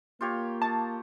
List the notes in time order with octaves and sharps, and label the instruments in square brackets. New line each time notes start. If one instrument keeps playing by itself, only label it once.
[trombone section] A#3 [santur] F4 G4 C#5
[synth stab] A5 [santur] C#6 D#6